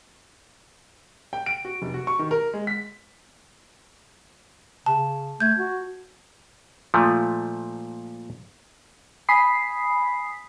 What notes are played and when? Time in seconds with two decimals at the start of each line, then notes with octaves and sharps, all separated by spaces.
1.33 G5
1.46 D7
1.65 F#4
1.82 F1
1.94 F#4
2.07 C#6
2.19 D#3
2.31 A#4
2.53 G#3
2.67 B6
4.86 C#3 A5
5.40 A3 G6 G#6
5.58 F#4
6.94 A#2 F3 A3
9.29 G#5 B5 D#6 B6 C7